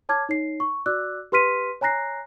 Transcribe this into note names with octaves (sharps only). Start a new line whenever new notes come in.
C#5 A5 D6 F6 G#6
D#4 C#5 C7
C#6
F#4 D5 D6 E6 F#6
G4 B4 C6 F6 B6 D#7
C#5 G#5 A#5 F#6 A#6 C7